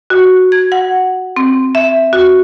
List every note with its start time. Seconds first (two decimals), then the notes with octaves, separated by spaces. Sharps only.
0.10 F#4
0.52 G#6
0.72 F#5
1.37 C4
1.75 E5
2.13 F#4